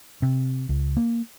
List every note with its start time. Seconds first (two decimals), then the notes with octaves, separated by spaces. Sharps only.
0.22 C3
0.69 C#2
0.97 A#3